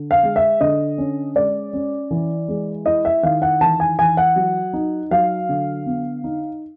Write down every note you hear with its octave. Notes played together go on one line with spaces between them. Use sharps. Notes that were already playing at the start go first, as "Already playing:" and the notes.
Already playing: D3
F5
G#3
E5
D3 D#5
C#4
G#3 D5
C#4
E3
G#3
E4 D#5
E5
D#3 F5
F#5
E3 A5
G#5
E3 G#5
F#5
F#3
D#4
F#3 F5
D3
B3
D#4